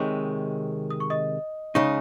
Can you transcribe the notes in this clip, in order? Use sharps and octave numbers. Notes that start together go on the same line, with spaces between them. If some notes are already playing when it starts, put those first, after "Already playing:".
Already playing: C3 D#3 G#3 C#5 C#6
D#6
C#6
D#5 D#6
C#3 G#3 D#4 C#5 C#6